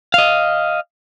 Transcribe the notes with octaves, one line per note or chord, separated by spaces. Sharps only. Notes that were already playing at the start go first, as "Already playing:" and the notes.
D#5 F5